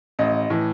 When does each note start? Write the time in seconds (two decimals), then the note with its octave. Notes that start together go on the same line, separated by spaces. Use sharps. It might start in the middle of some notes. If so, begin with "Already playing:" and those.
0.19 A1 D#5
0.50 A2 E3